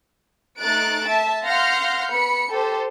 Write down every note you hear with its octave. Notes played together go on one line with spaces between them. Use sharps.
A3 D#4 F#6 A6 D7
E5 A5
F5 F#5 C6 F6 G6 A#6
B3 B5 C#7
G4 A4 C5